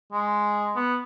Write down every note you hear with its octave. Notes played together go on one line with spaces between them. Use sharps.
G#3
B3